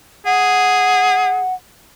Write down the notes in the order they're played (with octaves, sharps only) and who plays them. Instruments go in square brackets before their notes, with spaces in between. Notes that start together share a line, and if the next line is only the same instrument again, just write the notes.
[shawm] G#4 [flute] F#5